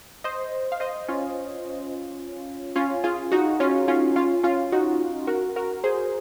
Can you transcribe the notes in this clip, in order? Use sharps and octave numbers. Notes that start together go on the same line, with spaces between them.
C5 D#5
F5
C5 D#5
C#4 F4
C#4 F4
F4 G#4
D#4 F#4
C#4 F4
C#4 F4
C#4 F4
C#4 F4
D#4 F#4
F#4 A#4
F#4 A#4
G#4 C5